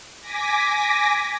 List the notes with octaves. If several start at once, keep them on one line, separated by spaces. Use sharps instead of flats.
G#5 D6 A#6 B6